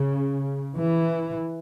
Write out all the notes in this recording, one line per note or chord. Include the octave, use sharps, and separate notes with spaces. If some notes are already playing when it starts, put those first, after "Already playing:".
Already playing: C#3
E3